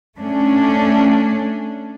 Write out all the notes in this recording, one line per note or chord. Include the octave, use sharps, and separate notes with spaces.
A3 C#4 D4